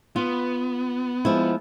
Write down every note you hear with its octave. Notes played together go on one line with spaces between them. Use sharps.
B3 F4
F3 G#3 E4